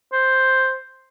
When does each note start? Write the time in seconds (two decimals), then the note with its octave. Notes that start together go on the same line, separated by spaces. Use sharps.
0.13 C5